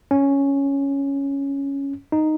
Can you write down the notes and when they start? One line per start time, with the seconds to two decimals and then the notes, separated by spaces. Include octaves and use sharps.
0.11 C#4
2.12 D#4